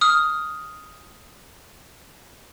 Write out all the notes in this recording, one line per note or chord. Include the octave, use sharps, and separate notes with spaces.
D#6 F6